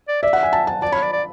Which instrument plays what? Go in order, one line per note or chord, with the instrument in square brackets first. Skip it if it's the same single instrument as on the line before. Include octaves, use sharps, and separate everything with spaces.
[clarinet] D5
[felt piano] D5 [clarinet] E5
[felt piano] F#5
G#5
A5
A5
[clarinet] D5 [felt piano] A5
[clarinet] C#5 [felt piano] B5
[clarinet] D5
D5